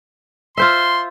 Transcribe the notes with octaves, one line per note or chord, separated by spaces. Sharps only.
F4 C5 E5 C6